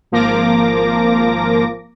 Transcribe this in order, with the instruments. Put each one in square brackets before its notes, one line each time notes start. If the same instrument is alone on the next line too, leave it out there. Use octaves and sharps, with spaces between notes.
[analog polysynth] G#1 F3 A#3 A#4 D6 A#6